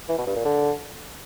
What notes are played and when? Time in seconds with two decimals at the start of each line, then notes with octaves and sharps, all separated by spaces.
0.09 E3
0.18 B2
0.27 G2
0.36 A#2
0.45 D3